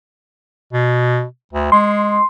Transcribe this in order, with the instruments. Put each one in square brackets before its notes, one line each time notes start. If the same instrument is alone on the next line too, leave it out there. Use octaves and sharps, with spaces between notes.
[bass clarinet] B2
D2
[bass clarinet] G#3 [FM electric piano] C6